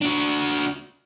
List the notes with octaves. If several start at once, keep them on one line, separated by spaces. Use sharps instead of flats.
D4 F#4